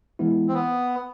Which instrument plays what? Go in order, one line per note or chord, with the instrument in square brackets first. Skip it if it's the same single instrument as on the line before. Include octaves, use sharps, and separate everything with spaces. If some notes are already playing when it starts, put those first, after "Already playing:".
[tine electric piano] E3 G#3 B3 E4
[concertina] C4
B3